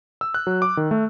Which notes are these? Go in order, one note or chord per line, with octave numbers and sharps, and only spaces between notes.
E6
F#6
F#3
D6
D#3
A3